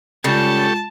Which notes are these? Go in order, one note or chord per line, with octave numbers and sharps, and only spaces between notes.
C#3 G3 G#3 F4 G4 A4 A5 C#6